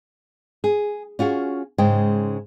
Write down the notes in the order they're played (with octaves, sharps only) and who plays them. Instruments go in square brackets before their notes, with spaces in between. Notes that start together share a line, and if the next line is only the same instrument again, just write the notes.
[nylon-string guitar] G#4
C#4 F4 F#4 G#4
G#2 C#3 G#3 G5